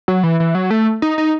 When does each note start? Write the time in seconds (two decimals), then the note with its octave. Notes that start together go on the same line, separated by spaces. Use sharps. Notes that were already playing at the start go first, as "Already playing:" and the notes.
0.08 F#3
0.23 E3
0.40 E3
0.55 F#3
0.70 A3
1.02 D#4
1.18 D#4